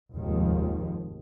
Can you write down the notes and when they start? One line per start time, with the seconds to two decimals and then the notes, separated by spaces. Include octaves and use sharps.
0.15 F1 D#2 G#2 D#3 F3